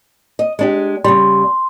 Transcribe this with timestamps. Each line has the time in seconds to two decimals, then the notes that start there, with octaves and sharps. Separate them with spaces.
0.39 D#5
0.59 G#3 D4 G4
1.04 C#3 G3 C6